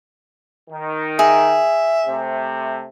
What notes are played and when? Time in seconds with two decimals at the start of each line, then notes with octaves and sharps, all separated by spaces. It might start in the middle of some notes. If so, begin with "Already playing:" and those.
0.69 D#3
1.19 G#4 E5
2.07 C3 A3